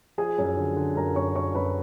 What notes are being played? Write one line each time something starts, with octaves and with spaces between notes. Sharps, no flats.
F3 G#4 G#5
F#2
D3
D3
F#2 A#4 A#5
F#2 C#5 C#6
F#2 C#5 C#6
F#2 B4 B5